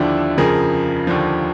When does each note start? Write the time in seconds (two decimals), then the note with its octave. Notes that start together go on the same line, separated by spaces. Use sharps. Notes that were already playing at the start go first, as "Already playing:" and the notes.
Already playing: D#2 D3 F3 D4 E4
0.38 F2 C#3 F3 G#4 A#4
1.07 D#2 D3 F3